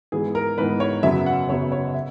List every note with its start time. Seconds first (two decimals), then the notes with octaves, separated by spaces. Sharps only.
0.12 G#2 E3 B3 G#4
0.35 A#4
0.58 G#2 E3 B3 B4
0.80 C#5
1.03 F#2 C#3 F#3 B3 E5
1.26 F#5
1.49 F#2 C#3 F#3 B3 C#5
1.72 C#5
1.94 E5